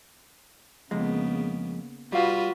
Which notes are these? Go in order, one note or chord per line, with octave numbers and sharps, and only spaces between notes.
F2 C#3 G#3 A#3 B3
G3 F4 F#4 B4 F5